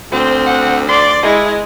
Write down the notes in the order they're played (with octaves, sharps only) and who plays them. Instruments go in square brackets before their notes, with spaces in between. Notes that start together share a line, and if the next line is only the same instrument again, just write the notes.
[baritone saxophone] D2 [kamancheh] C4 [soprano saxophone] C5
[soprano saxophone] F#5
[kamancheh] D5 [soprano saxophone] C6
[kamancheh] G#3 E4 [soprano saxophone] D#5